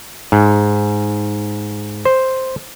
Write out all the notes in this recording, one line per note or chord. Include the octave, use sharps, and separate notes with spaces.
G#2
C5